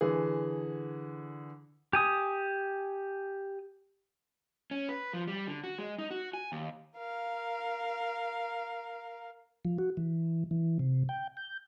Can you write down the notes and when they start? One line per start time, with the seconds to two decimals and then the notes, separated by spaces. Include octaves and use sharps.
0.01 D3 E3 G#4
1.93 G4 G#5 D#6
4.71 C#4
4.89 B4
5.13 F3
5.28 G3
5.48 D3
5.64 F#4
5.78 G#3
5.99 D#4
6.11 F#4
6.34 G#5
6.52 D#2
6.96 A#4 F5
9.65 F3
9.78 F#4
9.97 E3
10.51 E3
10.79 C3
11.09 G5
11.37 G6